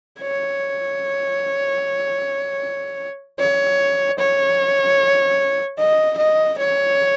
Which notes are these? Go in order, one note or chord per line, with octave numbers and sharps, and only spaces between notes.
C#5
C#5
C#5
D#5
D#5
C#5